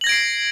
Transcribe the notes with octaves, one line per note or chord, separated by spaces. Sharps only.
G#6 A#6 C7 D7 F#7